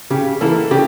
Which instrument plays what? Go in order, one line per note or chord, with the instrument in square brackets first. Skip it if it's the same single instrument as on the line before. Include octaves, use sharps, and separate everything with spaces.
[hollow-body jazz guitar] C#3 [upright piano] G4
[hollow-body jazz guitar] E3 A#3 E4 [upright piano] A4
[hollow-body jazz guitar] C#3 [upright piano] G4